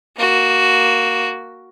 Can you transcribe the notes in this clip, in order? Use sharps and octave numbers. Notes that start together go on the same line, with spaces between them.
A#3 F#4